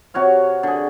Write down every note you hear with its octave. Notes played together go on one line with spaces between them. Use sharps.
C3 F#4 C#5 F5
D3 G#4